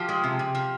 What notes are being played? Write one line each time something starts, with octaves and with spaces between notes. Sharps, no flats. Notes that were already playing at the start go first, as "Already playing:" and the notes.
Already playing: F3 G4
G#3
C3
C3
F3